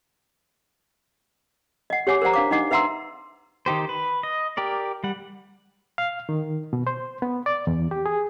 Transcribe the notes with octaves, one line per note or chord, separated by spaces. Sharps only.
D#5 F#5
G4 C#5 F#5 G#5 D6
A#4 C5 D5 F#5 A#5
D4 F5 D6
D4 D#4 D#5 F#5 D6
B4 E5 F#5 A#5 C6 E6
D#3 D#4 G4 C5
B4
D#5
G4 A#4 D5
G3 F#5
F5
D#3
B2
C5
B3
D5
E2
G4
G#4